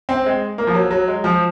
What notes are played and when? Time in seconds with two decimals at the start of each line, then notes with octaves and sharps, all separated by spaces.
0.09 C4
0.26 G#3
0.58 A#3
0.67 F3
0.74 F#3
0.91 F#3
1.08 G#3
1.24 F3